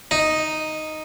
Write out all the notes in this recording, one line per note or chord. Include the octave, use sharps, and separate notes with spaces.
D#4